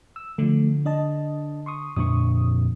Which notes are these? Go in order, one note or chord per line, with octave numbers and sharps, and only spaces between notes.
E6
D3 F3 A3
D4 D#5 A5
C6 C#6 D#6
F2 A#2 D4 C#6 D#6